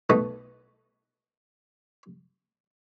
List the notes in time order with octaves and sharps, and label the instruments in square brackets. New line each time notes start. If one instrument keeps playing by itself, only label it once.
[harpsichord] B1 B2 A3 D#4 D#5